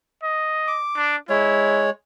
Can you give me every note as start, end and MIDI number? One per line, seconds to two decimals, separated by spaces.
0.23 0.80 75
0.68 1.16 86
0.97 1.17 62
1.29 1.90 56
1.29 1.86 64
1.29 1.90 73